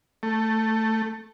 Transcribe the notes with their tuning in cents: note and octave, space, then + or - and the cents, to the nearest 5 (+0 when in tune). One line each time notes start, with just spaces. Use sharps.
A3 +10